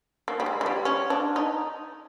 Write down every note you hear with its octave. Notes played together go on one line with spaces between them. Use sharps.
A#3
G3
G#3
G#3
G3
C#4
D4
D#4